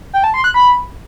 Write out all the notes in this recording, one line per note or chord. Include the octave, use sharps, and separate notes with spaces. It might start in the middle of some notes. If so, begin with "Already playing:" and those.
G5
A5
C6
F#6
B5